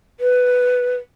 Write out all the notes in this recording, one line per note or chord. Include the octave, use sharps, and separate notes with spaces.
B4